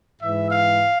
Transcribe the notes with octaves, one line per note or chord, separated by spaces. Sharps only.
G#2 E3 E5
F5